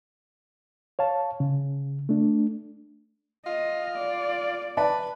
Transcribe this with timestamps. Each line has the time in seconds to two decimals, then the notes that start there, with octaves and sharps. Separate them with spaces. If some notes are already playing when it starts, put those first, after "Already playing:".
0.99 C#5 F5 A5
1.40 C#3
2.09 A3 D4
3.47 F4 D#5
3.96 D5
4.77 B4 D5 A5